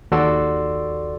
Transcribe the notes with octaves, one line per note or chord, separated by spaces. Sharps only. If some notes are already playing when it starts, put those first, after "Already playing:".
D#2 F#4 A4 D5 C6 E6